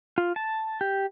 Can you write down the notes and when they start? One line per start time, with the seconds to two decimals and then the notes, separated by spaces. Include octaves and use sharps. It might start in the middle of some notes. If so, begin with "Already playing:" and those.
0.18 F4
0.36 A5
0.81 G4